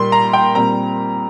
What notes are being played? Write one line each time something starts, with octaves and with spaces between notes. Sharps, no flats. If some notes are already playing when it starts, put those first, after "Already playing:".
Already playing: A#2 G3 A#3 C6
A#5
G5
A#2 G3 C4 A#5